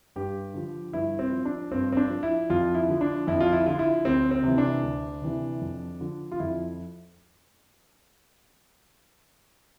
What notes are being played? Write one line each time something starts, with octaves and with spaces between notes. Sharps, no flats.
G2 G4
D3 F3
G2 E4
C4
F3
D4
G2 C4
C4
D4
F3
E4
F2 F4
E4
D3 F3
D4
F2 E4
F4
E4
D3 F3 F4
E4
D2 C4
C4
C3 E3
D4
D2
C3 E3
F2
D3 F3
F4
F2 E4